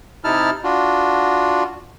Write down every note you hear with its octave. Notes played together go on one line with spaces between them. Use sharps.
C3 D#4 E4 A5 F6
D4 F4 F#4